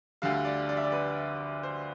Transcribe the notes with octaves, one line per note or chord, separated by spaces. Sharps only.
D2 D3 G3 F5
D5
D5
E5
D5
B4
C5